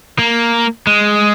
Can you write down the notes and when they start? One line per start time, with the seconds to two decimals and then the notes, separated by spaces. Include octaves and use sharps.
0.19 A#3
0.87 G#3